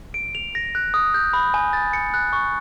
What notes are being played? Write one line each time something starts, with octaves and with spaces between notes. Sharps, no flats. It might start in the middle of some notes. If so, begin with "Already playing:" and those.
D7
F7
A#6
F#6
D#6
G6
B5
G#5
A6
C#7
F#6
C#6